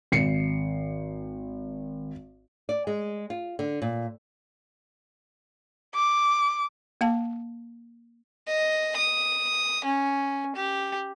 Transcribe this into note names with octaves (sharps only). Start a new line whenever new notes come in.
G#1 C7 C#7
D5
G#3
F4
D3
A#2
D6
A#3 F5 A5
D#5
D#6
C#4
G4